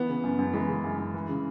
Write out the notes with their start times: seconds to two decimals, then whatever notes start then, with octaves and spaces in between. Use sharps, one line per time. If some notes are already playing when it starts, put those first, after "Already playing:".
Already playing: E3 B3
0.09 C#3
0.24 F#2
0.39 F#2
0.53 E3 G#3
0.69 C#3
0.84 F#2
0.99 F#2
1.14 E3
1.29 C#3